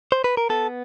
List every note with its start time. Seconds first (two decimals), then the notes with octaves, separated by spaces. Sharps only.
0.12 C5
0.24 B4
0.37 A#4
0.49 B3 A4